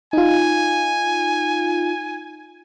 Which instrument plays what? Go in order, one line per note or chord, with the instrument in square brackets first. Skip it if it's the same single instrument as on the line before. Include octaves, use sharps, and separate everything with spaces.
[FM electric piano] D#4 F4 [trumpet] G#5